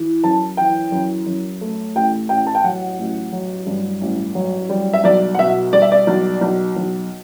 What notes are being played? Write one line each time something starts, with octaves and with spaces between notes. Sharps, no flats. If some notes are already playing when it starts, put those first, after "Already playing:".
Already playing: E3
F#2 A5
E3 G5
F#2
F#2
A3
A1 G5
A1 G5
A5
G5
F#3 F#5
A1
F#3
G2
A1
F#3
G3
E5
B1 D5
F#5
B2 E5
G3 D5
E5
D5
B1
B1
B1